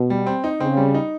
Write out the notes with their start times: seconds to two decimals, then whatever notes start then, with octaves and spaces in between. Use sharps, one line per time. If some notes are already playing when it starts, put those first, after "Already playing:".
Already playing: B2
0.10 G3
0.27 C4
0.44 D#4
0.60 C#3 C4
0.77 G3
0.94 D#4